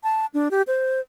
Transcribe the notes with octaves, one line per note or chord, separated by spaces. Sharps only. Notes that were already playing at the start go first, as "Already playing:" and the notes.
A5
D4
G4
C5